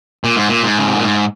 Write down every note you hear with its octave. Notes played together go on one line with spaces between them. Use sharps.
A#2
G#2
A#2
G#2
C#3
C3
A#2
G#2